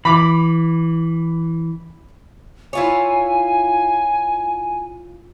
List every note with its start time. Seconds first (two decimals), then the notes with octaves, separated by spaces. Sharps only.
0.05 E3 B5 D6
2.73 E4 F4 C#5 G#5